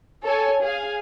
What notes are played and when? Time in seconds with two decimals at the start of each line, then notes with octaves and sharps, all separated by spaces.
0.23 A4 C#5 G#5
0.61 G#4 F5 G#5